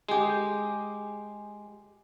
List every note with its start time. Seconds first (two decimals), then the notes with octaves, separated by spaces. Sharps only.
0.09 G#3 G4 G#4